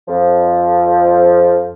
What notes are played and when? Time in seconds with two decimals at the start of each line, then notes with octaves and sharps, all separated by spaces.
0.08 F2 F3